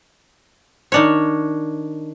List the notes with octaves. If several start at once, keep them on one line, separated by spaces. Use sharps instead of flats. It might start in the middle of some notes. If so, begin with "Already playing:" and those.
D#3 D4 C#5